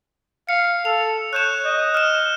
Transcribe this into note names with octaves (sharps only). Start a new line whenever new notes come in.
F5 C#7
A4 F7
C#5 F#6 G6 E7
D#5
F6 E7